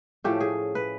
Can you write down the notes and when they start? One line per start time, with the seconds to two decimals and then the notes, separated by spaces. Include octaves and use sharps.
0.24 A2 F3 A3 C#4 G4
0.40 G#4
0.75 B4